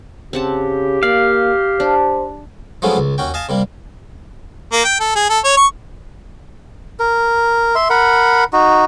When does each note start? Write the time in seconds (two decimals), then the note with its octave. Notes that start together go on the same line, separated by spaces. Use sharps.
0.33 C#3 C4 G4 F#5 A5
1.03 A#3 D5 F5
1.80 D4 C5
2.82 F3 F#3 G#3 A3 B3 C#4
2.97 C#2
3.18 D#2 C#4 F#4 G5
3.34 D#5 F5 G#5 A5
3.49 C3 G3 A#3
4.73 A#3
4.85 G5
5.00 A4
5.16 G#4
5.30 A4
5.44 C#5
5.57 C#6
7.00 A#4
7.75 E5 C6
7.90 A#4 F#5 B5
8.53 D#4 F#4